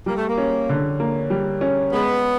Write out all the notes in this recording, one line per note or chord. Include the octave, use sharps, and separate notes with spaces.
G3 A#3
A3
A#3
C#4
D3
A#3
G3
C#4
G#3 B3